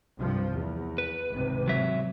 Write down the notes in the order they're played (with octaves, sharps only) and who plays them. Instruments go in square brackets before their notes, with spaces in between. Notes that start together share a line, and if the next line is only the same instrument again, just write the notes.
[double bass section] C2 G2 F3
E2
[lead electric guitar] B4
[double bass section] G#1 C#2 C3
[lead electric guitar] F#3 E5